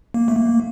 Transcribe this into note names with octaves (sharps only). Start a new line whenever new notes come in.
A#3
A3
A#3